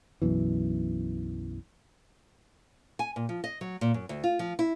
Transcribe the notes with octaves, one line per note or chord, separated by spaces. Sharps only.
B1 F#2 B2 E3
G#5
A#2
F3
D#5
F#3
A#2
F#2
D2
F4
F3
E4